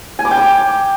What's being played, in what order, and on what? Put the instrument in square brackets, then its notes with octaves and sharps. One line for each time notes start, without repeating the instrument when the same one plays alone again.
[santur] G#5
D6
G5
D6